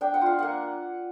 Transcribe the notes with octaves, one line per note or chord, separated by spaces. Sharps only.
D4 G5
F#5
F4 F5
A#3 F#5